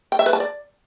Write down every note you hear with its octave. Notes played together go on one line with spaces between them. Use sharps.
G5
E5
B4
A5
D5